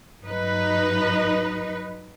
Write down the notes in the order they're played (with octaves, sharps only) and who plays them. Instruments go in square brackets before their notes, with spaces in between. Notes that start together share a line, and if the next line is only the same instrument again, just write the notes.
[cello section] G2 F#3 D#4 B4